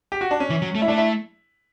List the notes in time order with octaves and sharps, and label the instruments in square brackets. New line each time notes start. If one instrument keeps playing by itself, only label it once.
[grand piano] G4
F#4
D4
C#4
[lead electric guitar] E3
F#3
A3
[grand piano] E4
[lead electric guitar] A3 [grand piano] D4
[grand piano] E4